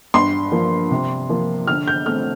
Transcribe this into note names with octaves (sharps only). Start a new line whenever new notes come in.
G2 C6
F3 A#3
C3
F3 A#3
D3 F6
G6
A3 C4 F6